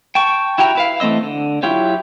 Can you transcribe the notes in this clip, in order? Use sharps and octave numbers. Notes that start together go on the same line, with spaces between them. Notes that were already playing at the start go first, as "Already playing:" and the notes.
G5 A5 C#6
E4 F#4 G4 G5 A#5
E4 B4 F5
E3 A3 C4 D#5 E6
D3
F#3 E4 F4 G4 C#5